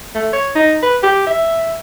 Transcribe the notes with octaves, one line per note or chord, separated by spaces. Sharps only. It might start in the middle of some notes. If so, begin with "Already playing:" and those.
A3
C#5
D#4
B4
G4
E5